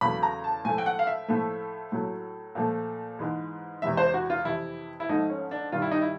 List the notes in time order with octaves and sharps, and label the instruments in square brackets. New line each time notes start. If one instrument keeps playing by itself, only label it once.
[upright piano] E2 C#3 F#3 A3 B5
A#5
A5
A2 F3 A3 G#5
G5
F#5
F5
E5
A2 F3 A3
A2 F#3 A3
A#2 F3 A3
G#2 E3 G#3
E2 C3 E3 G#3 E5
C5
F#4
F4
F2 C3 E3 E4
E4
G#2 F3 A3 D#4
C#4
D4
G2 D#3 G3 F4
E4
D#4
E4